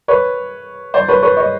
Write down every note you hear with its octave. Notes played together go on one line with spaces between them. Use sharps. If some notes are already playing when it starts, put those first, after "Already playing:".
B4 C#5
C5 D5
B4 C#5
B4 C#5
C#5 D#5